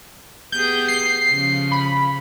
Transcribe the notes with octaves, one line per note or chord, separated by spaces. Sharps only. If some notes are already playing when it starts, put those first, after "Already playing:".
B3 G4 G#4 G6
C7
C#3 F3
B5